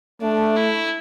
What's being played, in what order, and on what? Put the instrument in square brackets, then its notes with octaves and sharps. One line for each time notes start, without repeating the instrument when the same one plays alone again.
[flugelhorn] A3 [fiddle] D4
[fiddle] E4